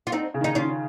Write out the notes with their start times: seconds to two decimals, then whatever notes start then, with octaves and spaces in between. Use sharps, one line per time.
0.07 F4
0.12 C4 D#4
0.34 C#3
0.41 D#3 D#4
0.55 C#4 F4